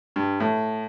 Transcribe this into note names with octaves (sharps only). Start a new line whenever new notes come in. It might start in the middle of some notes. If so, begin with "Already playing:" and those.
G2
A2